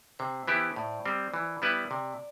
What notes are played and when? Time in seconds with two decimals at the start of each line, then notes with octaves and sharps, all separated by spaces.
0.19 C3 C5
0.47 E3 B3 E4 G4
0.76 A2 D5
1.05 G3 C4
1.34 E3
1.62 G3 B3 E4 B4
1.90 C3 D5